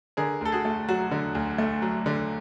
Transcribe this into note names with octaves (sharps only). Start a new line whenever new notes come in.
D3 G#4 A#4
D2 A4
F#4 G#4
A3
F#3 F#4
D3
D2
A3
F#3
D3